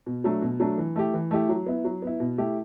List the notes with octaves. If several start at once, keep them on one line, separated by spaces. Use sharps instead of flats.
B2
F#3 A3 D4
B2
F#3 A3 D4
E3
A3 E4 G4
E3
A3 E4 G4
F#3
B3 E4
F#3
B3 E4
B2
A3 E4 G4